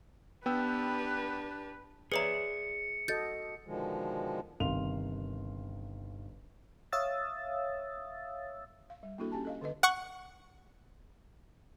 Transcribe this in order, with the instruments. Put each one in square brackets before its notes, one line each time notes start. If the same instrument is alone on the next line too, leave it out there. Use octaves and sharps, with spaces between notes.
[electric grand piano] B3 G5 E6 [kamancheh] D4 G4 [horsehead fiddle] B4
[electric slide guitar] G#4 D5 E5 [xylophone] B4 C#5 A#5 [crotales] C#7
[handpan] F#4 A4 D#5 [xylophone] G6 A6
[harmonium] B2 D3 D#3 F3 G#3
[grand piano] G1 C3 D#3 F5 C6 F7
[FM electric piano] C#5 E5 F5 D#6 E6 A6
[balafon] F5
G3
A#3 D4 E4 F#4 A4
C#4 G4 G#5 A5
A4 D#5 F5
D3 A4 B4 D#5
[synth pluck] F#5 C#6